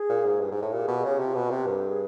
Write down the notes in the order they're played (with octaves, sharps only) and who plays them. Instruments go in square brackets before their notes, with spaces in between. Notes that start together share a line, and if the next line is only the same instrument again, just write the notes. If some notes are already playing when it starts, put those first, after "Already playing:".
Already playing: [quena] G#4
[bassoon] A#2
G#2
G2
G#2
A2
[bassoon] A#2 [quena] G4
[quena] G#4
[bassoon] B2 [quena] G4
[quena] G#4
[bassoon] C#3 [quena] G4
[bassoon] C3
[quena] F4
[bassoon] B2 [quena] F#4
[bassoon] C3
[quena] B4
[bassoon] G2 [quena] A#4
[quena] A4
G#4